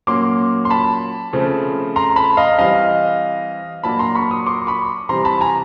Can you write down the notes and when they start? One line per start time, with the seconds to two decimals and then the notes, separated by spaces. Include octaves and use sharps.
0.07 A#2 F#3 A#3 C#4 C6 D6
0.65 C6
0.70 A5 B5
1.33 C#3 F3 A3 C4
1.96 A#5 C6
2.16 A5 B5
2.37 D#5 F5
2.58 E3 G3 C4 D#5 F5
3.83 A#2 F#3 A#3 D4 A5 B5
3.99 A#5 C6
4.15 B5 C#6
4.31 C#6 D#6
4.46 C6 D6
4.67 B5 C#6
5.09 C3 E3 G3 C4 A#5 C6
5.25 A5 B5
5.41 G#5 A#5